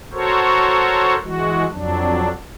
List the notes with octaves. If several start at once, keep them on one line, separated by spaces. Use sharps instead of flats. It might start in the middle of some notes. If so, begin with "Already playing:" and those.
F#4 A4 A#4 C5 C#5
E3 G#3 F#4
F2 F#3 D4